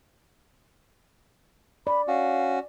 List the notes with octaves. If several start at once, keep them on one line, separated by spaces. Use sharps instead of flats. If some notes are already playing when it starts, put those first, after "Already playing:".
D5 B5
C#4 F#4 F5